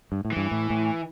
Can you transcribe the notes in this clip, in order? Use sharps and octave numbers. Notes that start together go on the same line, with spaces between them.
G2
A2
G2 E3
A2
A2